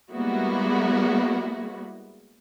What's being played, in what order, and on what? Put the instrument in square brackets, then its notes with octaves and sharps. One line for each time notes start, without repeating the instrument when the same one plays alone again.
[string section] G3 G#3 A#3 B3 E4 F#4